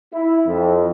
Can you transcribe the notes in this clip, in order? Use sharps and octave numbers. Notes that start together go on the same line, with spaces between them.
E4
F2